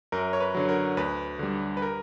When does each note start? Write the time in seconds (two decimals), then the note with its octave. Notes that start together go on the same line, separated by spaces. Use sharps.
0.12 F#2 A#4
0.33 C#5
0.40 B4
0.55 D3 F#3
0.69 A#4
0.97 D2 B4
1.39 D3 G3
1.77 B4
1.82 A#4